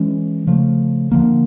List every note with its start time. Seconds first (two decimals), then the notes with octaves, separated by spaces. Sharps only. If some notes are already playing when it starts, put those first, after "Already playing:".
Already playing: E3 G#3 C#4
0.47 C#3 F3 A3
1.12 D3 F3 A#3